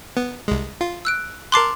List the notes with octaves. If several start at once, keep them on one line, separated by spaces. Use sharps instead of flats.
B3
C2 G#3
F4
E6 F#6 D7
A#4 A5 C6 D6 F#6 C7